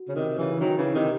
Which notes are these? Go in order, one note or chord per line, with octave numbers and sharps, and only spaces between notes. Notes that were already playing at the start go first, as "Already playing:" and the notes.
Already playing: F#4
C#3
C3 D#3
C#3 E3
D#3 F#3
C#3 E3
C3 D#3